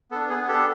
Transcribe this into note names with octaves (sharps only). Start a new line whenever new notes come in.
B3 D4 A4
B3 G#4
D4 G4 A4